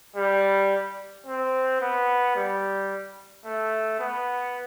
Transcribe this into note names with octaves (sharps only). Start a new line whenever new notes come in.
G3
C4
B3
G3
A3
B3